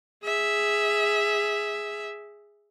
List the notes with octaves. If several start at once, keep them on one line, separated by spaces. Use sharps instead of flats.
G#4 E5